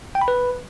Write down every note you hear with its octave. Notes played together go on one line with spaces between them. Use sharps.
G5
B5
B4